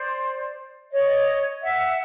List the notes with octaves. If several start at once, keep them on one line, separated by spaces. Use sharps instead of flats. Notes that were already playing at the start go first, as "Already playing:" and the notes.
Already playing: C5 D5
C#5 D#5
E5 F#5